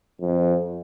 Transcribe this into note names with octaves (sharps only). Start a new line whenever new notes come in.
F2